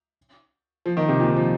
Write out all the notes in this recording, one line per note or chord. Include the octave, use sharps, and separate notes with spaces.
F3
D#3
C3
A#2
D#3
F3